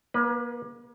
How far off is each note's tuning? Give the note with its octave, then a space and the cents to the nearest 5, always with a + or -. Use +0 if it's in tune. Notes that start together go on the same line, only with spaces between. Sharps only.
A#3 +35 B4 +0